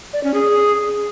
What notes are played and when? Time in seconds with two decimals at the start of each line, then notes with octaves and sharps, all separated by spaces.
0.13 D5
0.24 C#4
0.34 G#4